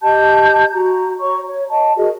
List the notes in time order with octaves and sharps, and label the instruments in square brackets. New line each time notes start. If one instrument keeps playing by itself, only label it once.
[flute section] G4 D#5 A5 G6
F#4 A#5
C#5 A#5 C#6
C#5
D#5 A5
F#4 G#4 A#4 D#5